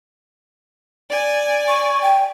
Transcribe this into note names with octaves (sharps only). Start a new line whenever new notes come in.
D5 G#5
C#6
G5